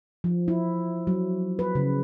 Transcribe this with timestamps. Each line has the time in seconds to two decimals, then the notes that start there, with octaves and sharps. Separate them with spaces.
0.24 F3
0.48 E4
1.07 F#3
1.59 B4
1.75 C#3